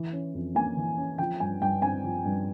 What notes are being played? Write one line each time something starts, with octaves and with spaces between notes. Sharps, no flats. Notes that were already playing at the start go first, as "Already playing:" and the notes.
Already playing: E3
C#4
F2
A#3 G#5
E3
C#4
F3 G5
G2 G#5
G2 G5
C4 G#5
F3
G2